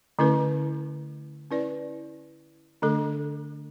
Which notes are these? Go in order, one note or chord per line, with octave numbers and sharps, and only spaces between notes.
D3 A3 C#4 E4 B4
C#4 E4 B4 D5
D3 A3 D4 A4